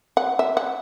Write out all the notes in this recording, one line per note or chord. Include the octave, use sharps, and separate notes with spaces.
F#5
E5
F#5